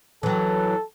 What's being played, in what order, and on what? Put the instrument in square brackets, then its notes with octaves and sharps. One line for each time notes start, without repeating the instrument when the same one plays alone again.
[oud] E3 F#3 [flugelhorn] A4